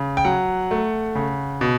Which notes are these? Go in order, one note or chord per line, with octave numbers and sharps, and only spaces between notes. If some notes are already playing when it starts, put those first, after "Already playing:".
Already playing: C#3
G5
F#3 F#5
A3
C#3
B2